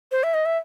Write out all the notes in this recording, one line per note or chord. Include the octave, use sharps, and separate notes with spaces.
C5
E5
D#5
E5